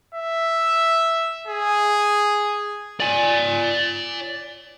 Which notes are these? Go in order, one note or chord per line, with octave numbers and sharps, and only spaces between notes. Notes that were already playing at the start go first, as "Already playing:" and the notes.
E5
G#4
D5 G#5